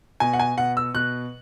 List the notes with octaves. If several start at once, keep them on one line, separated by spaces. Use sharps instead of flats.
B2 G#5
F#5
G#5
B2 F#5
E6
B2 F#6